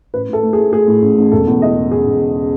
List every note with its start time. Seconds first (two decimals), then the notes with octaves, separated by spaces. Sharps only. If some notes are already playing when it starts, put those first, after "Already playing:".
0.14 A1 B4
0.28 A2 A4
0.43 A3
0.53 G#4
0.58 A3
0.72 A3 G#4
0.88 A2
1.02 A1
1.18 A1
1.32 E1 A4
1.47 E2
1.62 C#3 D#5
1.76 C#3
1.91 C#3 G#4
2.06 E1
2.21 C#3